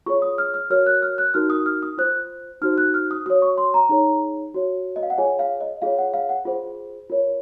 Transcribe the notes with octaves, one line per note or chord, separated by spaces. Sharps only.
F4 G#4 C#5 C#6
D#6
F6
F6
F#4 A#4 C#5 F6
F#6
F6
F#6
D#4 F#4 A#4 F6
D#6
F6
D#6
F4 C5 F#6
D#4 F#4 C5 F6
F#6
F6
D#6
F#4 C#5 D#6
C#6
C6
A#5
D#4 G#4 C#5
F#4 C#5
D#5
F5
F#5
F4 G#4 C#5 G#5
F5
D#5
F4 G#4 C#5 F5
F#5
F5
F#5
F4 G#4 C5
F4 A#4 C#5